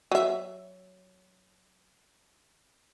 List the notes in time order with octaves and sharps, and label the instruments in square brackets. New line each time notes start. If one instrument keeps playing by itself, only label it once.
[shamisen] F#3 E5